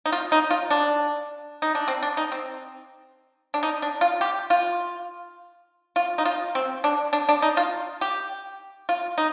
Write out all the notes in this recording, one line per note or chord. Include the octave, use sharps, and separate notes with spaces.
D#4
F4
D#4
F4
D4
D#4
D4
C4
D4
D#4
C4
D4
D#4
D4
F4
G4
F4
F4
D#4
F4
C4
D4
D4
D4
D#4
F4
G4
F4
D#4